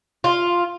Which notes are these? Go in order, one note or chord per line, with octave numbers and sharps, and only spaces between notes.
F4